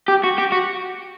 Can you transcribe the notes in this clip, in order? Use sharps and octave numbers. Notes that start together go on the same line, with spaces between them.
G4
F#4
G4
F#4